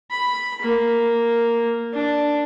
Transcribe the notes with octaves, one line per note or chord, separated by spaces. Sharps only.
B5
A#3
D4